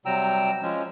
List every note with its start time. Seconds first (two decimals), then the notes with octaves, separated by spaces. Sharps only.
0.06 C3 F#3 G3 G5 A#5 E6
0.62 F3 G#3 C#4